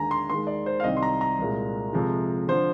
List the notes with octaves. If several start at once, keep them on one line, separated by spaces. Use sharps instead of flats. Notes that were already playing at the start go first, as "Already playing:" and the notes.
Already playing: D#2 D3 G#3 G#5 A#5
C6
D#2 D#3 G#3 C6
D5
C5
F5
C2 C3 D#3 G3 D#5
C6
A#5
A#5
C2 A#2 G#3
F2 C3 F3 G#3
D3 F3 C5